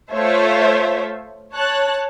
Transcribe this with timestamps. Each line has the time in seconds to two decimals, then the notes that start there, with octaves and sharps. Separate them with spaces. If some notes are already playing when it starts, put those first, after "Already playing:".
0.12 A3 F4 C5 C#5 E5
1.52 C#5 A5 F#6